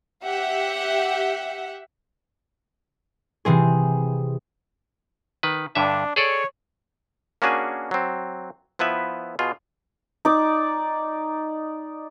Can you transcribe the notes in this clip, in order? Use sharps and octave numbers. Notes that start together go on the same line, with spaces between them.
G4 E5 F#5
C3 E3 C4 G#4
D#3 B4
G2 D3 D4 E5
G#4 A4 C#5 D5
A#3 C#4 D4 F#4 G#4 G#5
F#3 C4
F3 B3 E4 B4 E5
B2 F4 G#4
D#4 D5